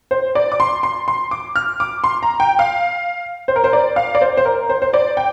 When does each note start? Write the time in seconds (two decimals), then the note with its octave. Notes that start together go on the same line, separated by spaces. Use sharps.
0.11 C5
0.35 D5
0.52 D6
0.60 C6
0.83 C6
1.08 C6
1.31 D6
1.56 F6
1.80 D6
2.04 C6
2.23 A#5
2.40 G5
2.59 F5
3.48 C5
3.56 A#4
3.64 C5
3.73 D5
3.96 F5
4.15 D5
4.21 C5
4.37 C5
4.45 A#4
4.69 C5
4.82 C5
4.94 D5
5.17 G5